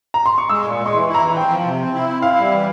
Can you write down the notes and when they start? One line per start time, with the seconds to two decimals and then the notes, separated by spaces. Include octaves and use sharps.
0.14 A#5
0.26 C6
0.38 C#6
0.49 G#3 E6
0.64 A#2
0.72 C#6
0.79 G#3
0.86 C#6
0.93 E3 C6
1.08 E4
1.15 A#5
1.21 E3
1.37 C4 G5
1.50 F3
1.65 C3
1.80 C4
1.94 E4
2.09 C4
2.22 E4 F5
2.37 G3
2.52 E3